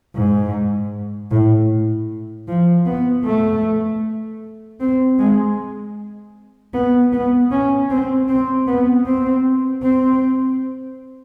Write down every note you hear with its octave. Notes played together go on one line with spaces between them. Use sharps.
G#2
A2
F3
B3
A3
C4
G#3
B3
B3
C#4
C4
C4
B3
C4
C4